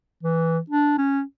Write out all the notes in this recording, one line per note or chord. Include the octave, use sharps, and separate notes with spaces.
E3
D4
C#4